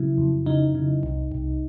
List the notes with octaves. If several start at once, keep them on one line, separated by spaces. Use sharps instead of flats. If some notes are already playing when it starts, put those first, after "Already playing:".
Already playing: C#3 F#3 E4
F2
C#3 D#4
C#3
C2
C2